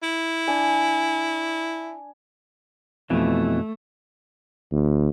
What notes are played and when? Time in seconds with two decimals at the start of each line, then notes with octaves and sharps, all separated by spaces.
0.03 E4
0.48 D4 G#5
3.10 F2 B2 E3 A3
4.72 D2